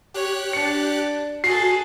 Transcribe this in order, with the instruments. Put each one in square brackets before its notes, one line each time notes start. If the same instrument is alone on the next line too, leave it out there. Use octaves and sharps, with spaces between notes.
[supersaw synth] G4 F#6 [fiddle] C#5
[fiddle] D4 [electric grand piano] C#7
[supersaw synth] F#4 [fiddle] G#4 A4 [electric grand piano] C7